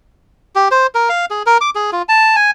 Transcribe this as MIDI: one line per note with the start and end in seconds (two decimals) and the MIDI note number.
0.56 0.68 67
0.71 0.87 72
0.95 1.09 70
1.09 1.26 77
1.30 1.43 68
1.46 1.58 70
1.61 1.70 86
1.75 1.91 68
1.92 2.02 65
2.09 2.36 81
2.36 2.51 80